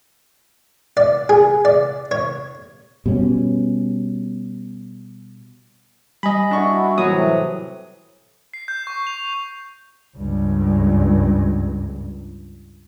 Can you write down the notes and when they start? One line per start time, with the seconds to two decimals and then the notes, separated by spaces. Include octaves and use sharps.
0.97 D5
1.29 G#4
1.65 D5
2.11 C#5
3.06 B2 G3 A3 C#4
6.23 G3 D#5 G#5 B5
6.51 D4 E4 F#4 C#6
6.98 A2 C3 E3 F#3 D#6
8.54 C7
8.68 G6
8.87 C#6
9.07 F7
10.17 C#2 G2